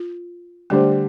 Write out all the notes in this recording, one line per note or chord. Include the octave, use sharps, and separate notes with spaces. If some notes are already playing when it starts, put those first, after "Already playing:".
Already playing: F4
D3 G3 A3 D4 G4 C5